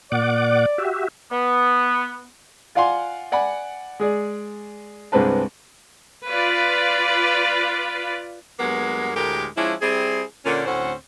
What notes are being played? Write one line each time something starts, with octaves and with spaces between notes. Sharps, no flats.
A#2 D5 F#5 D6
F#4 G4 E5
B3
F4 D5 F5 F#5 G#5 C6
D5 F#5 G#5 B5
G#3 G#4 D5
C2 G2 G#3 C4 B4 A5
F4 B4 D5
G2 F#3 G#3 A#3 B3 F#5
D2 A2 G#3 G4 A#4
F3 G#3 C#4 D4 E4
G3 C4 E4 G#4
A#2 D3 C#4
D2 A2 C4 C#4 C5 F#5